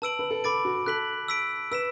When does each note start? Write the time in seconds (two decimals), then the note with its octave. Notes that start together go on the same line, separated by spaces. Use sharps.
0.02 B4 A5 E6 D7 F#7
0.19 B4
0.31 A4
0.44 A4 B5 D6 A6 D7
0.65 F#4
0.86 A4 F#6 B6 F#7
1.28 E6 B6 D7
1.71 B4 E6 B6 E7